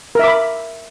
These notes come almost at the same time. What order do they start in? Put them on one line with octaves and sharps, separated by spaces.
A#4 E5 D6 B5